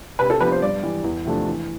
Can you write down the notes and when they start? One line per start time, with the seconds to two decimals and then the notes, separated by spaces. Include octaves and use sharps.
0.19 C3 B4
0.30 A4
0.40 F3 B3 D4 G4 B4
0.52 C5
0.62 G2 D5
0.83 E3 G3
1.04 E2
1.26 C3 F3 A3 D4
1.47 E3